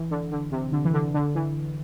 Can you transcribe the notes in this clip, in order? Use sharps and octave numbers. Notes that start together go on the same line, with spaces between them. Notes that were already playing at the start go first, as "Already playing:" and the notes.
Already playing: E3
D3
D3
C3
D3
E3
D3
D3
E3